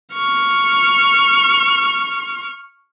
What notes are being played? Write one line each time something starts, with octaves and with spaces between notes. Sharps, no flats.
C#6 F6